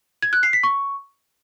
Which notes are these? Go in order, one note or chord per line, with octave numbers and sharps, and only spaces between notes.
G#6
F#6
C7
B6
C#6